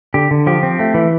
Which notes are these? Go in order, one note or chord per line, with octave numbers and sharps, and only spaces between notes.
D3 G4
D3
F3 G4
C4
A3
E3